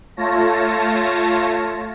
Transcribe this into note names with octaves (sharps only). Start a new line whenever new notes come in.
A3 F4 C#5 A5 A#6